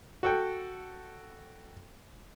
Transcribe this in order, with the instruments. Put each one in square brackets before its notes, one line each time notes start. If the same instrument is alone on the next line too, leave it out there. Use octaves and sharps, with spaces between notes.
[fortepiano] F#4 A4 G5